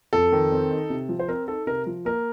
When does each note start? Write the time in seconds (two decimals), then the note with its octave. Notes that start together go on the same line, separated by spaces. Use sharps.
0.13 F2 A4
0.32 D#3
0.52 C4
0.71 D#4
0.90 C3
1.09 F3
1.19 C5
1.28 C4 A#4
1.48 D#4 A4
1.67 C3 A#4
1.86 F3
2.05 A#3 A#4